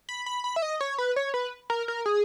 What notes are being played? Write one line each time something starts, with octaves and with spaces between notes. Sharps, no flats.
B5
B5
B5
E5
D#5
C#5
B4
C#5
B4
A#4
A#4
G#4